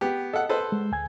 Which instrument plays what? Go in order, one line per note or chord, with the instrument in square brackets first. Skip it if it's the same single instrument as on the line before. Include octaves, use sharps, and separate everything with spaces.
[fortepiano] B3 G4
[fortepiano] A4 F#5 [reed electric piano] D#5
[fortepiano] A4 B4 C5
[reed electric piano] G#3
D2 G#5 G#6